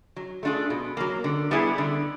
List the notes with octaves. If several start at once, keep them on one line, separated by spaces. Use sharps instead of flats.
F#3
A3 D4 F4 G#4
B2
F#3 A#3
D3
G3 B3 E4 G#4
D3